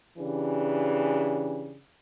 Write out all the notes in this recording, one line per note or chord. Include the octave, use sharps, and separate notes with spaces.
C#3 E3 D4 G4